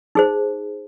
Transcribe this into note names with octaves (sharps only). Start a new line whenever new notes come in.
D#4 G#4 C5